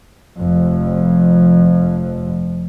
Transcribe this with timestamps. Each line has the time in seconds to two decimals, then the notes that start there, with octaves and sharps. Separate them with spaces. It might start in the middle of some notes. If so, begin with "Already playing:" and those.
0.39 F1 F2